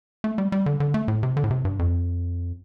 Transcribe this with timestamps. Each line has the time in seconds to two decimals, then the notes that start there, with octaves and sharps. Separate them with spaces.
0.24 A3
0.38 G3
0.52 G3
0.66 D3
0.80 D3
0.94 A3
1.08 A2
1.23 C3
1.37 D3
1.44 A2
1.51 C3
1.65 G2
1.79 F2